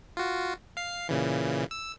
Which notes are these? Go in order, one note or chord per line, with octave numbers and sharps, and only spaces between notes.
F4 F#4
F5 C7
A#2 C#3 E3
E6